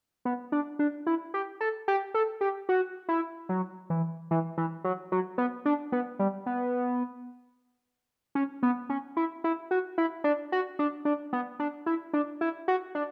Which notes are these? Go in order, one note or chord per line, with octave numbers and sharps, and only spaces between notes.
B3
D4
D4
E4
G4
A4
G4
A4
G4
F#4
E4
F#3
E3
E3
E3
F#3
F#3
B3
D4
B3
G3
B3
C#4
B3
C#4
E4
E4
F#4
E4
D4
F#4
D4
D4
B3
D4
E4
D4
E4
F#4
D4